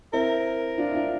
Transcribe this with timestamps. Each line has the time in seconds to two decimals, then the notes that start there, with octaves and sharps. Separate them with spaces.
0.13 C4 E4 A#4
0.78 D4 F4
0.90 E4
0.95 D4 F4